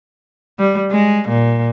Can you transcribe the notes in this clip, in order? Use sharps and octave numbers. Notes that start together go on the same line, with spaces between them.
G3
G#3
A#2